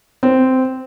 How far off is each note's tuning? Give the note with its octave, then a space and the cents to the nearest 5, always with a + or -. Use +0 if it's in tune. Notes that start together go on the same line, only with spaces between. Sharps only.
C4 -10